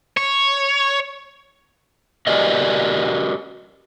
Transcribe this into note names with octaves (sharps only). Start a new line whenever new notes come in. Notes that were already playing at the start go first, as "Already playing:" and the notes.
C#5
F#4 G4 A#4 D5 D#5